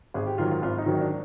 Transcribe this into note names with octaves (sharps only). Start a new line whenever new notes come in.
G#1 G#4
G4
G#2 D#3 F#3 F4
F4
G#1 F4
D#4
G#2 D#3 F#3
D#4
D4